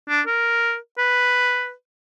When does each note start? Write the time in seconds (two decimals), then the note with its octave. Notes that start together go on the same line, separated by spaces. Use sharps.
0.09 D4
0.27 A#4
0.98 B4